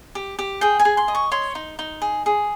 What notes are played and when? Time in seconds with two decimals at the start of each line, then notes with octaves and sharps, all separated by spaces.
0.15 G4
0.39 G4
0.61 G#4 G5
0.79 G#5
0.85 G#4
0.97 C6
1.08 D#5
1.15 C#6
1.32 C#5 C6
1.55 D#4
1.79 D#4
2.02 G#4
2.26 G#4